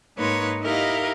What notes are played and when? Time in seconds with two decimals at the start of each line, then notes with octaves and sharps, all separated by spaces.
0.18 G#2 A#3 D#4 B4 C#5 C6
0.63 D#4 E4 G4 A#4 D#5 F5